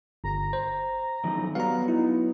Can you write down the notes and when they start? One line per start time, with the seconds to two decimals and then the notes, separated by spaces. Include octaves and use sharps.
0.24 G1 A#5
0.53 C5
1.24 F#2 D#3 F3
1.55 F#3 G3 B3 F5 A#5
1.88 D#4 E4